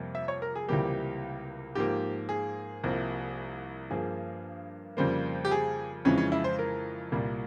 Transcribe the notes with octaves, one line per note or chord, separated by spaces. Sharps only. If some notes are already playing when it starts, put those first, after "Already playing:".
Already playing: F2 C3 G3 A#3
E5
C#5
A#4
G#4
C#2 C3 E3 G3 A#3 G4
G#2 F3 A#3 G4
G#4
C2 C3 F3 A#3
G2 F3 A#3 G#4
F2 C#3 G3 A#3 C5
G4
G#4
F2 C#3 E3 G#3 C#4
C#4
E4
C5
A#4
C2 A#2 G3 A#3